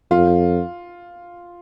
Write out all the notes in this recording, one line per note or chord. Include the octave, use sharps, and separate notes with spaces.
F2 F4